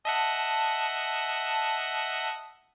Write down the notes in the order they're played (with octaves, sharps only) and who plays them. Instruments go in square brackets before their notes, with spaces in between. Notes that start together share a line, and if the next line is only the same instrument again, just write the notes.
[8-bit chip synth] D#5 E5 F#5 [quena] A5